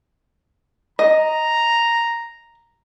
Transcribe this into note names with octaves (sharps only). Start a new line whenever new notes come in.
D#5 A#5